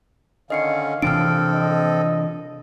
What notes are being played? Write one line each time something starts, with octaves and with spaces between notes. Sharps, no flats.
D3 D#3 C#4 D#5 F5 C7 C#7
C3 E3 F3 C4 D4 A4 F6 D7
D#5